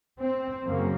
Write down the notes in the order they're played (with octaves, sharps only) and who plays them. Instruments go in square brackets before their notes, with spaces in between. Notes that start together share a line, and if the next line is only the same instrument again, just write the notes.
[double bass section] C4
F#2 C#3 A#3